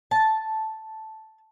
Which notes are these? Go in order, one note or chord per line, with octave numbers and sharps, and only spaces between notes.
A5